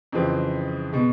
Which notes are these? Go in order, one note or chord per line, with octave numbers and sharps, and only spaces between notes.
F2 C#3 E3 G#3 C4
B2 G#3